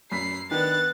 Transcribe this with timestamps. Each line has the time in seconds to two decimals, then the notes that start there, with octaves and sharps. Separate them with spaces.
0.12 F#2 B5 B6 C7
0.51 D#3 B3 D4 F#6 A6